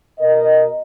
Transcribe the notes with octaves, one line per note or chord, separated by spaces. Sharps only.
B2 A#4 D#5